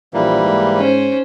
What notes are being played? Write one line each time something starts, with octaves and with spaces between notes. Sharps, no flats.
A#1 E3 G3 A#3
G#2
C#4 C5